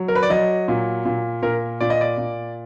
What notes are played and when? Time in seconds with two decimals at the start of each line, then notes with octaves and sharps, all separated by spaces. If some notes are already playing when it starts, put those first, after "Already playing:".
Already playing: F#3
0.08 A#4
0.15 B4
0.23 D5
0.30 F#3 D#5
0.68 A#2
1.05 A#2
1.42 A#2 A#4
1.81 A#2 D5
1.90 D#5
2.01 D5
2.18 A#2